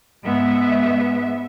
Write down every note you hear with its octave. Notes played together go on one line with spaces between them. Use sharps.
G#2 G#3 B3 E5